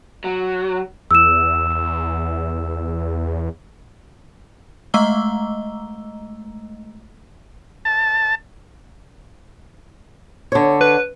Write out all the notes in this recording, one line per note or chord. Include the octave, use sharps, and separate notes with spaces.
F#3
E2 E6 E7
G#3 A3 D#5 A#5 E6 G7
A5
D3 C#5
B4